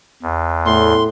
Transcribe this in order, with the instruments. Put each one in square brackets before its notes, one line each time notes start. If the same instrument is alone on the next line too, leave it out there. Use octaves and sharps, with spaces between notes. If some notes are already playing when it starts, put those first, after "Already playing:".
[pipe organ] E2
[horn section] A2 [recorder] C6